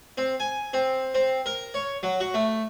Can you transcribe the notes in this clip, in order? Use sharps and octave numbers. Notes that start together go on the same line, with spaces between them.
C4
G#5
C4
C4
A#4
C#5
F#3
F#4
A3